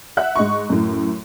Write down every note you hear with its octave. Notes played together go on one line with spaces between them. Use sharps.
E5 F#5 F#6
G#2 D#5 C#6
F#2 A2